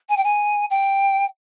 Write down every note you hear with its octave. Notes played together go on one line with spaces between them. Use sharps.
G#5
G5
G#5
G5